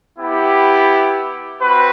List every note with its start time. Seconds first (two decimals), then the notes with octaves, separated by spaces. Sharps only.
0.19 B3 E4 G4
1.61 C4 F#4 B4